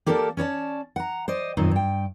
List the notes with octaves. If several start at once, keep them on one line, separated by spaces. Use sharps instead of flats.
A#3 G4 A4 A#4 D5 A5
C#4 C#5 D5 A5
F#5 A#5
C5 D5 D#5
F#2 A#2 D#3 C4 D#4
G2 G5